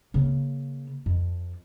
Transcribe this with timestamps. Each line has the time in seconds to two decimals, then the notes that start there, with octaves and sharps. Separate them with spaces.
0.14 C#3 A#3
1.06 F2